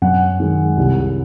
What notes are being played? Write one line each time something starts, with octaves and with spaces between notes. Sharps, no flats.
F#2 F#5
D#3 G#3
C2